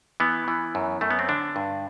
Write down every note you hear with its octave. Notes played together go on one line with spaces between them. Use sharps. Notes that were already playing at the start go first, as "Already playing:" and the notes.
E3 B3
E3
F#2
F#2 A3
B3
C4
D3 D4
G2